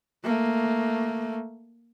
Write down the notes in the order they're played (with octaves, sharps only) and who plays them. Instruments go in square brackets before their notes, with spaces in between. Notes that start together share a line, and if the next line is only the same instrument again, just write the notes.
[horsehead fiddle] A3 A#3